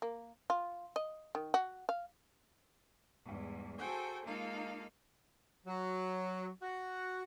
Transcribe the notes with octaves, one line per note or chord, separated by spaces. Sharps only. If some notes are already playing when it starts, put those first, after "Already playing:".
A#3
F4
D#5
D#3
F#4
F5
E2 G#2 G3
F#4 G#4 A4 C5 G5 G#5
G#3 A#3 D#4 F4 A4 F5
F#3
F#4